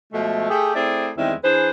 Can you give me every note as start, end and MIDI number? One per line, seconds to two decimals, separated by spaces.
0.12 0.46 47
0.12 0.46 53
0.12 0.46 56
0.12 0.46 57
0.49 0.70 57
0.49 0.70 67
0.49 0.70 68
0.74 1.09 57
0.74 1.09 60
0.74 1.09 64
0.74 1.09 68
0.74 1.09 72
0.74 1.09 74
1.17 1.33 40
1.17 1.33 51
1.17 1.33 55
1.17 1.33 56
1.17 1.33 60
1.17 1.33 64
1.43 1.70 52
1.43 1.70 62
1.43 1.70 68
1.43 1.70 71
1.43 1.70 72